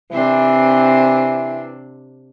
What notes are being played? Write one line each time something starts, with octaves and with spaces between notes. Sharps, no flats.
C3 E3 C4 D4